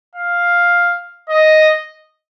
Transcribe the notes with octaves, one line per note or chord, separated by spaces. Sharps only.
F5
D#5